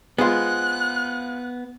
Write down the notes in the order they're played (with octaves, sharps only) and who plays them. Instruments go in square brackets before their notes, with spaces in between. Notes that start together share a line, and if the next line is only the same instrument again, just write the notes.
[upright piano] G#3 F4 [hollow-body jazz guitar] B3 C5 [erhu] F#6